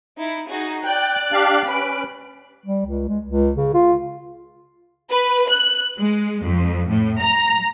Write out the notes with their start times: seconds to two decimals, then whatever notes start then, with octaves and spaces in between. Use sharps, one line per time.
0.16 D#4 E4
0.48 D#4 F#4 G#4
0.84 D5 G5 F#6
1.32 D4 G4 F5
1.66 C#4 B4 B5 D7
2.66 G3
2.85 C#2
3.08 G#3
3.26 C#2
3.57 C#3
3.74 F4
5.11 B4
5.49 F#6
5.99 G#3
6.44 F2
6.90 A2
7.20 A#5